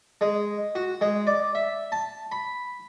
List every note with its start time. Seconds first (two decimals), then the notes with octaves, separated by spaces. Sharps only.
0.21 G#3
0.75 F#4
1.01 G#3
1.27 D5
1.55 E5
1.92 A5
2.32 B5